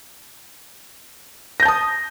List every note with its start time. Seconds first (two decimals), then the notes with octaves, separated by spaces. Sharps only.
1.60 A#6
1.63 G6
1.65 A5
1.68 D#6